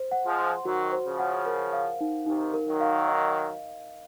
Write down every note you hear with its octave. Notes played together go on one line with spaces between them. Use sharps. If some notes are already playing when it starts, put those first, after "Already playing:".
Already playing: C5
F#5
F3 G#3
C6
D#3 F#3 F#4
C5
C#3 F3
F#5
A#4
F5
D#4
C3 D#3 D#4
A#4
D#3 F#3
F5
D#5